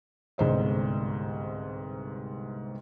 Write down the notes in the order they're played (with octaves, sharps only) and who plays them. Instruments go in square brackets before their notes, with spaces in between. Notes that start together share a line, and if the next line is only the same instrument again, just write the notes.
[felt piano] G1 C2 G#2 C5 D#5